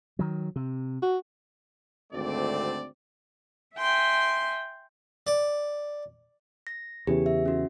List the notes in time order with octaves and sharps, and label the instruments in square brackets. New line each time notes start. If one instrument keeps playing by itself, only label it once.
[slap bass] D#3 F#3
C3
[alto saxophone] F#4
[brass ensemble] G#1 D2 A3 C4 D5
[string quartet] E5 G5 G#5 C6
[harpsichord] D5
[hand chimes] A#6
[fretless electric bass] E2 C#3 E3 [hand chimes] G4
[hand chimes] E5
C#4 F#4